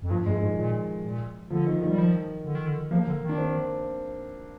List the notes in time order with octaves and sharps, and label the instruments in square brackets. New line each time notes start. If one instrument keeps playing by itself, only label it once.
[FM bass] F2
[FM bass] G2 [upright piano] F3
[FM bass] G2 [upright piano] G#3
[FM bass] G#2 [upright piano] D#3
[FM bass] A#2
A#2
[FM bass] D3 [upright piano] F3
[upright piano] D#3
D#3
[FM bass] G3
F3
D3
D#3
D3
[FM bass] F3 [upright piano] A#3
[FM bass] D3
D#3
[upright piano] D4
C4